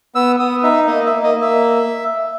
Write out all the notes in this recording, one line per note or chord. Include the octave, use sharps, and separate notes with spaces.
B3 E6
B3 D#6
D#4 E5
A#3 D#5
E5
A#3
D#5
A#3
E5